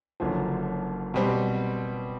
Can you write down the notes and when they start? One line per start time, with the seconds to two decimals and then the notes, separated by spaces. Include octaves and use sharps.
0.20 F#1 F#2 D3 F3
1.14 B2 G3 C4